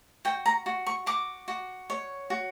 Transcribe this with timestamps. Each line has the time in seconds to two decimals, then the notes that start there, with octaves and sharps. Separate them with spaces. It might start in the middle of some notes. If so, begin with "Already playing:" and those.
0.25 F#4 G5
0.46 A#5
0.66 F#4
0.87 C#6
1.06 F#4 D6
1.48 F#4
1.90 C#5
2.30 F#4